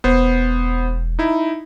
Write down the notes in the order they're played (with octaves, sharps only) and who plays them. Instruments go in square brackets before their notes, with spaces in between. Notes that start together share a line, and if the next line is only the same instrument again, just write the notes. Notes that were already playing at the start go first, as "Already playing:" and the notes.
[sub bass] E1 [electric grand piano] B3 C5
[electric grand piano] D#4 E4